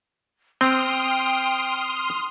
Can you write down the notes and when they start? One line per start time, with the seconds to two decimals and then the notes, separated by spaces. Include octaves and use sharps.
0.61 C4 G5 C6 D#6 F6